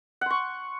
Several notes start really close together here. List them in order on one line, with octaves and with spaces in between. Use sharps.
F#5 C6 C#6